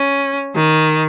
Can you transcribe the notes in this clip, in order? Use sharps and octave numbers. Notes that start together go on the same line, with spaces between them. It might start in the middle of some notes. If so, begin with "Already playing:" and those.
Already playing: C#4
D#3